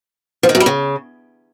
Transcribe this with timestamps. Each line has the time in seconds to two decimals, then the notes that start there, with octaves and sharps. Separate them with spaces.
0.43 F3
0.49 D#3
0.55 F#2
0.60 G3
0.66 C#3